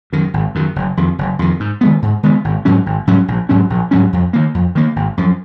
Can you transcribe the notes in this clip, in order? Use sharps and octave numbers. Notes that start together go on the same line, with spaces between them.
F#2 D#3
G#1
F#2 D#3
F#1
F2 D#3
F#1
F2 D#3
G#2
D#3 G#3 B3
G#2
D#3 G#3 B3
G#1
G#2 F#3 C#4
G#1
G#2 F#3 C#4
A#1
G#2 F#3 C#4
A#1
G#2 F#3 C#4
F2
D#3 A#3
F2
D#3 A#3
G#1
F#2 F3